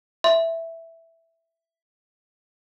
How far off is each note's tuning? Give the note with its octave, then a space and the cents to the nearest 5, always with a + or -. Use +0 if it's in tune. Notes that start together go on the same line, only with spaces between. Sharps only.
E5 +0 C6 +0